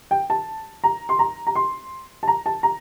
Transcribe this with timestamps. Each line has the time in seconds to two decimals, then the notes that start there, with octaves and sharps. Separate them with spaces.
0.11 G5
0.30 A5
0.84 A#5
1.09 C6
1.19 A#5
1.47 A#5
1.55 C6
2.23 A5
2.28 A#5
2.46 A5
2.63 A#5